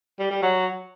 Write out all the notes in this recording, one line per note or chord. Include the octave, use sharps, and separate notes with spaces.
G3
G3
F#3